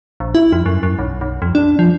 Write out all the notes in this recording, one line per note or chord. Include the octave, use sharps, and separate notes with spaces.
A#1
E4
F2
F#2
F#2
B1
B1
F2
D4
F3